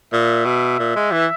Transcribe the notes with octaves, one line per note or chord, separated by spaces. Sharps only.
A#2 E5
B2
A#2
G#3
E3